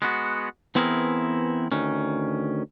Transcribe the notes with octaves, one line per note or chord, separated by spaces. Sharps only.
G#3 B3 F#4
E3 B3 C4 E4 G#4 A#4
D2 D#3 C#4